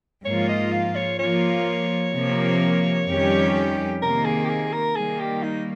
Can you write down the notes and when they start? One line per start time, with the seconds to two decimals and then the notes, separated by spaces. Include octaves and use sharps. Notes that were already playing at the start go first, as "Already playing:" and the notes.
0.25 G#2 F3 A#3 F4 C#5
0.49 D#5
0.72 F5
0.95 C#5
1.19 F3 A#3 F4 C#5
2.13 C3 F3 A#3
3.08 F2 D#3 G3 C#4 G4
4.02 C3 D#3 A#3 A#4
4.25 G#4
4.45 G4
4.49 G#4
4.73 A#4
4.96 D#3 G3 A#3 G#4
5.19 G4
5.43 D#4